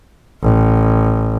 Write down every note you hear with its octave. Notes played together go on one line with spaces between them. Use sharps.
A1